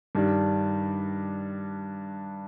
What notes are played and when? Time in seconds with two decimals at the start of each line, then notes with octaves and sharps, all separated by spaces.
0.15 G2 D#3 G3 D4